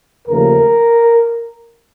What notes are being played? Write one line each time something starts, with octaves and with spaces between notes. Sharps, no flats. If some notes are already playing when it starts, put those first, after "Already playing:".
D#2 C#3 F3 A3 A#4